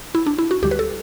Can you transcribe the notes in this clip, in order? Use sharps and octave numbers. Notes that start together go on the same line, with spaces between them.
E4
D4
E4
F#4
D2 D3 G3 G4
B4
A4